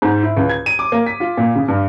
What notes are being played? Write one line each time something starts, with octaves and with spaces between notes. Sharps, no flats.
G#2
E4
C#2
G#6
D#7
D6
A#3
B6
F4
A#2
C#3
G2